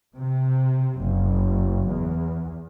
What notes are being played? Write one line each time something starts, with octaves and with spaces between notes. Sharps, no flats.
C3
F#1
E2